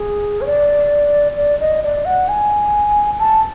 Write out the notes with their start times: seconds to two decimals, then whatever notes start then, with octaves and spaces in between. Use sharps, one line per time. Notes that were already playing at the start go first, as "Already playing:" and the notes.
Already playing: G#4
0.41 C#5
0.46 D5
1.38 D5
1.60 D#5
1.83 D5
2.05 F#5
2.29 G#5
3.19 A5